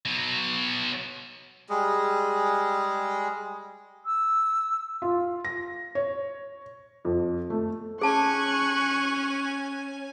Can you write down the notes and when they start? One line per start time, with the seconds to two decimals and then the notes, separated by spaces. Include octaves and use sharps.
0.06 B2 F#3
1.70 G3 G#3 G#4
4.06 E6
5.02 F4
5.45 A#6
5.95 C#5
7.05 F2
7.50 A3
8.02 C#4 G#4 G#5 A5 C#6 F#6